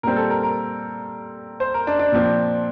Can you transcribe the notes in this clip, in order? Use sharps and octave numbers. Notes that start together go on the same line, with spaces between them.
A#2 G3 C4 A#4
A4
A#4
A#4
C5
A#4
D4
D4
A#2 F3 C4